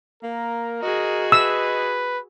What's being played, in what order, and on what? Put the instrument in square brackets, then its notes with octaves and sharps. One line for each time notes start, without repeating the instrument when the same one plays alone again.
[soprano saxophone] A#3 [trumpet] A#4
[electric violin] F#4 G#4 [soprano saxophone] D#5
[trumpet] B4 [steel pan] E6